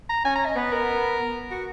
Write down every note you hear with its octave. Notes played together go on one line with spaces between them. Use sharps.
A#5
C#4 G#5
A#5
D#5
B3 B4
A#4
F#4